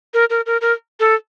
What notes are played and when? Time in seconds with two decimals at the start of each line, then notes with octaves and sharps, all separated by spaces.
0.14 A#4
0.30 A#4
0.46 A#4
0.61 A#4
1.00 A4